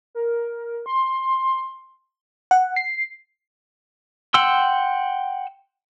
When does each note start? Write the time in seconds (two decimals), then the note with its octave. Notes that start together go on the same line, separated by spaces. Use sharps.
0.15 A#4
0.86 C6
2.51 F#5
2.76 C7
4.34 F#5 G5 C6 E6